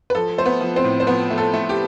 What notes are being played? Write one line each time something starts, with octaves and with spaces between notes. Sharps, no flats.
B4
F3 A4
A3 C5
B3 B4
F3
C4 C5
A2
C5
F3 B3 B4
A3
A4
A3
G4